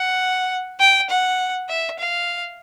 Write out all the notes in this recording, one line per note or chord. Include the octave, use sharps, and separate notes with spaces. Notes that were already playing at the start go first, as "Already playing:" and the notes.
Already playing: F#5
G5
F#5
E5
F5